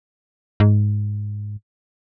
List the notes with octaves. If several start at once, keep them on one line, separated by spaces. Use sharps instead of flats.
G#2